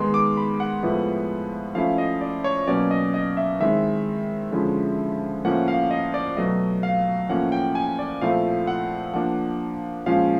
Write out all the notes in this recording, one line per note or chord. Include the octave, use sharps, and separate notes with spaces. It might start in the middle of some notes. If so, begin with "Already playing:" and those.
Already playing: D#3 G#3 B3 D#4 C6
D6
B5
F#5
A2 F3 G#3 B3 E4
F3 A3 C#4 E4 F5
D#5
D5
C#5
B2 F#3 A#3 C#4 D5
D#5
D#5
E5
D#3 G#3 C4 E4 E5
D3 F3 G#3 C#4 E4
A2 F3 A#3 C#4 F#5
F5
D#5
D5
B2 F#3 A3 D#5
F5
A2 F3 A#3 C#4 F#5
G5
G#5
D5
A#2 F3 A3 C4 E4 F5
F#5
F3 A#3 D4 F#5
A#2 F3 G#3 C#4 F5